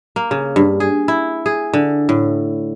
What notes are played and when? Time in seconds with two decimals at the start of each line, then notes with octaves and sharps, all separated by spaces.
0.16 A#3
0.31 C#3
0.56 G2
0.80 G#4
1.08 E4
1.46 G#4
1.73 D3
2.09 A2